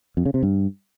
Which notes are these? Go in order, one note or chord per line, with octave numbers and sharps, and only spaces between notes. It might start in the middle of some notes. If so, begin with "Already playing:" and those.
F2
C#3
C3
G2